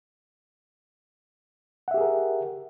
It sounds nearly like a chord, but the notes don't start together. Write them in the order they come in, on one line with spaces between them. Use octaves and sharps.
F#5 E5 G4 G#4 A#4